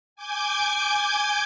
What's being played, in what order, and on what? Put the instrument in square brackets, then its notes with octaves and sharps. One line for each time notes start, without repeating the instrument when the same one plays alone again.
[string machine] G#5 D6 G6 G#6